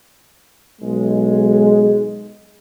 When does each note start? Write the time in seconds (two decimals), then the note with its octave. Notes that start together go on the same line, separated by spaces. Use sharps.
0.82 B1 G#3